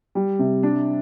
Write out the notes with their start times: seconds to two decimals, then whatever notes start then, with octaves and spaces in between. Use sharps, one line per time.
0.15 G3
0.39 C3
0.63 D4